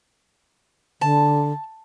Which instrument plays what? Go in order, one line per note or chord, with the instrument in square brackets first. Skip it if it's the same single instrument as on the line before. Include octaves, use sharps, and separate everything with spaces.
[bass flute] D3 [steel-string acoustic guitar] A5